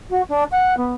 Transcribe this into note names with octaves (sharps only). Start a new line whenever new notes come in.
F#4
D4
F#5
B3